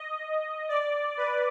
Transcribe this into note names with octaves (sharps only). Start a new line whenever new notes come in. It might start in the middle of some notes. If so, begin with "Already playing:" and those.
Already playing: D#5
D5
B4